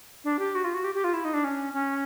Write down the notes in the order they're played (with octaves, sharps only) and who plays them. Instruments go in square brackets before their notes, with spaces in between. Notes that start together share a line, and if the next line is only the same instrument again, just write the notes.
[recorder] D4
G4
F#4
F4
F#4
G4
G4
F4
E4
D#4
D4
C#4
C#4